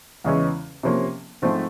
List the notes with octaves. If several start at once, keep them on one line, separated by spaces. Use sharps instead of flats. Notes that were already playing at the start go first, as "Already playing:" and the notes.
E2 C#3 E3 G#3 C#4
C3 F3 A#3 C#4
G#2 F3 A3 C4